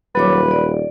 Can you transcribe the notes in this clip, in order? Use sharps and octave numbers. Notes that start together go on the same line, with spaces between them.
D#1 F#3 B4 C#5 D6
D5